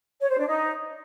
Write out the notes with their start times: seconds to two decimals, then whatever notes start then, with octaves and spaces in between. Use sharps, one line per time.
0.21 C#5
0.30 C5
0.38 D4
0.47 D#4